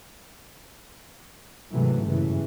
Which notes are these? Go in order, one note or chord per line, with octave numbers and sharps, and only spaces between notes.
G#2 C3 D#3 E3 F#3 A3
F#1 G2 A#2 C#3 E3